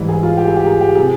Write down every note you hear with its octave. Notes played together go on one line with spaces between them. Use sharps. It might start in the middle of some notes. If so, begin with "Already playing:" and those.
Already playing: G#2 E3 G3
G#4
F4
G4
G#4
G4
G#4
G4
C3 F3 G#4